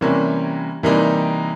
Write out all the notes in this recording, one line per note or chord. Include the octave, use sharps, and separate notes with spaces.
C3 E3 G3 A#3 C#4
C3 E3 G3 A#3 D#4